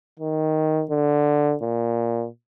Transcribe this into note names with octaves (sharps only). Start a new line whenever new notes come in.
D#3
D3
A#2